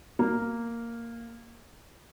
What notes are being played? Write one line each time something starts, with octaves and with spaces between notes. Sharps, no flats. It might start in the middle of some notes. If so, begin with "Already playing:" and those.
A#3